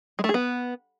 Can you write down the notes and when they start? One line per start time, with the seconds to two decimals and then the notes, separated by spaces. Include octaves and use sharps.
0.19 G#3
0.24 A3
0.29 G#4
0.34 B3